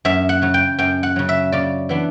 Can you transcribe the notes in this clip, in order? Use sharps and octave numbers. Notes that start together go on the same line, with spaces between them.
F#2 E5
F#5
C#3 F#3
G5
F#2 G5
F#5
C#3 F#3
E5
C#3 D5
E3 B3 D4